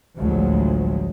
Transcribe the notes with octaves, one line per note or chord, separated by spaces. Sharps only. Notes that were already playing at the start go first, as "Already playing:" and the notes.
A1 D2 F3 F#3 G#3